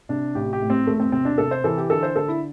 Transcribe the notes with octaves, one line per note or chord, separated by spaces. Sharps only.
C3 D4
A1 G4
G4
A2
C4
E1 A3
C4
C3 C4
D4
C3 A4
C5
E3 A4
G4
D3 A4
C5
D3 A4
E4